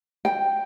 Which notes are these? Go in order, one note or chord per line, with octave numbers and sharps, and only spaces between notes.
G5